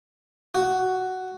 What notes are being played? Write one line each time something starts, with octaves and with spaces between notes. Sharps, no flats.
F#4